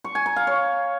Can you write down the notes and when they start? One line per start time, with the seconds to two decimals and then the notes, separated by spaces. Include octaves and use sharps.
0.04 C#6
0.15 G#5
0.26 A#5
0.36 F5
0.47 C#5